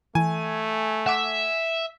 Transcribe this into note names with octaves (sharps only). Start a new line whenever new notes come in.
E3 A3 G#5
E5 F#5 D6 E7